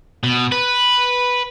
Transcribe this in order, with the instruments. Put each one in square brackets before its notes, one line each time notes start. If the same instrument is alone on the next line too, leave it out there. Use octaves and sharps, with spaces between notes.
[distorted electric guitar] B2
B4